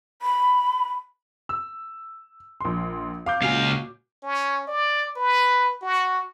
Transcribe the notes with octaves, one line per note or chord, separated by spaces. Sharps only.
B5
E6
A#1 C6
F5 D6 G6
C#2 A#2 F#4 F5 G#5
C#4
D5
B4
F#4